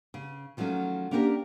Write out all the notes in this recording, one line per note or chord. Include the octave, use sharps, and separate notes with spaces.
C#3
D#3 F3 F#3 A3 C#4
A#3 C#4 D4 G4 A4 A#4